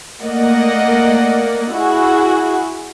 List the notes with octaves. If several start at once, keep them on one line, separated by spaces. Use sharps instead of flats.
A3 A#3 D5 D#5 F#5
E4 F#4 G#4